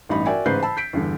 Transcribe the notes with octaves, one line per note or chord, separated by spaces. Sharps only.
A1 G2 D#4 B5
F#4 A#4 D5 E5 G5 G#5
A1 G#2 C#3 B4 G6 C7
A5 B5 E6
G6 B6 D7
E2 G2 D3